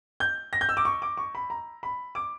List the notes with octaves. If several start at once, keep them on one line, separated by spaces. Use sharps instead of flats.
G6
A#6
G6
E6
D6
C#6
D6
C#6
B5
A#5
B5
D6